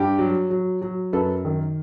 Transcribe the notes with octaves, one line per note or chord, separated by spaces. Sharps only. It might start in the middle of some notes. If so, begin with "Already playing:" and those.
Already playing: G2 G4
F#3
F#3
F#3
F#2 A4 B4
D#3